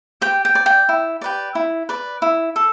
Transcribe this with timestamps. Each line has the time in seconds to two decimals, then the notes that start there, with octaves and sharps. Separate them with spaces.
0.21 G4 G5
0.45 G5
0.55 D5
0.66 G5
0.89 E4
1.21 G4 B4 D5
1.55 E4
1.89 B4 D5
2.22 E4
2.56 A4